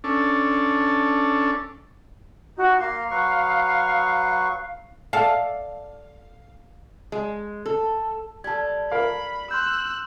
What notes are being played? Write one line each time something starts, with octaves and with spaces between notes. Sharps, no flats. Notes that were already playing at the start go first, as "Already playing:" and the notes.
C#4 D4 A4
D#4 F#4
A#3 F5 A#5 C6
F#3 B4 C#6
A4 D5 F5 A5
G#3
A4
G3 A4 A5 G#6
A#4 F5 B5
C6 E6 F#6 G6